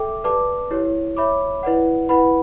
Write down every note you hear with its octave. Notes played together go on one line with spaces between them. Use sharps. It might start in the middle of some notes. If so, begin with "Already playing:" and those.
Already playing: A4 E5 G5 D6
G4 B4 D5 A5 D6
E4 G4 C#5
C#5 E5 B5 D6
E4 B4 D5 F#5
E4 B4 F#5 B5